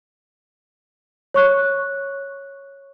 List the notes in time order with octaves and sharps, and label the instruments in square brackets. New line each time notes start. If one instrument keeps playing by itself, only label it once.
[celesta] C#5 C#6 F#6